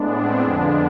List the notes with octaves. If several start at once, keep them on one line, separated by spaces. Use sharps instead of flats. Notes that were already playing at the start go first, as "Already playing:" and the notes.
Already playing: A2 G#3 B3 D4
C4
F2 D3 F3 G#3 B3 D4